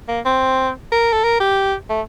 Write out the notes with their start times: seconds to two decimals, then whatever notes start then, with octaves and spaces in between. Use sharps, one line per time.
0.08 A#3
0.25 C4
0.91 A#4
1.12 A4
1.24 A#4
1.40 G4
1.89 A3